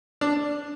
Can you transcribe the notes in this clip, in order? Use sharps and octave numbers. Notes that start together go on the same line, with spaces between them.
D4